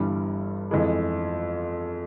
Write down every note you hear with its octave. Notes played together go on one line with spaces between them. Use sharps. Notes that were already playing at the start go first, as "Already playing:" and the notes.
Already playing: G1 G2 E3 G3
F2 E3 G#3